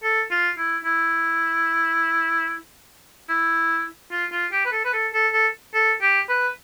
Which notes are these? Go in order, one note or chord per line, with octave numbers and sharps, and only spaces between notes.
A4
F4
E4
E4
E4
F4
F4
G4
B4
A4
B4
A4
A4
A4
A4
G4
B4